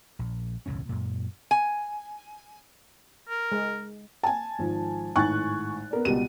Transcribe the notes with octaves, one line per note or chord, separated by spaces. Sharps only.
A#1
E1 C#2 A2 C#4
F#2 A#2
G#5
A#4
G#3
G#5 A5
G#1 F3
G#1 A2 G#5 C#6 F#6 A6
B3 A#4 D5
C#2 B2 G3 D#7